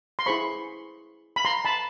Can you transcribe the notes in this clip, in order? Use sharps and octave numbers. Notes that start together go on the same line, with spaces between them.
C6
E4 G#4 C5 B5 C#6
B5
A#5 C6
A5 B5